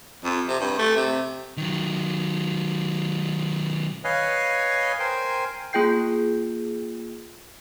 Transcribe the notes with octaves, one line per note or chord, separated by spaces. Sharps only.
F2
C3
G2
A3
C3
D#3 F#3
B4 C#5 D#5 F5 G#5
A#4 C5 G5 G#5
A#3 F4 G#4 G5 G6 C7